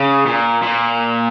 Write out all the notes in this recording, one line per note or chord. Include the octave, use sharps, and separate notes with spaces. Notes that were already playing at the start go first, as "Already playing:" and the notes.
Already playing: C#3
A#2
A#2